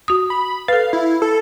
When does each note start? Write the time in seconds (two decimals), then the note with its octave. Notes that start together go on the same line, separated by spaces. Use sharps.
0.08 F#4 D#6
0.30 B5
0.68 A4 B4 F5
0.93 E4
1.22 A4